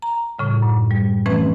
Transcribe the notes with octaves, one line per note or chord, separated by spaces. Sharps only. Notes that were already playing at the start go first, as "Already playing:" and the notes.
A#5
A2 C#3 G3
F#2
G3
E3 F3 A3 C4 C#4 B4